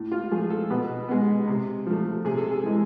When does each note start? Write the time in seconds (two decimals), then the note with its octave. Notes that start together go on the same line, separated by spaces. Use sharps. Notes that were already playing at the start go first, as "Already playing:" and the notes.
Already playing: A2
0.11 F4
0.31 F3 A3 G#4
0.50 A4
0.70 B2 B4
1.09 G#3 B3
1.48 C3
1.87 F3 A3
2.25 C3 G#4
2.38 A4
2.51 G#4
2.63 E3 G#3